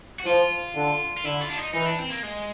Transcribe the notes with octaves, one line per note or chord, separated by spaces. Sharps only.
F#4
F3 F4
D3
F4
D3 E4
F4
D4
D#4
E3 D#4
D4
C4
A#3
G#3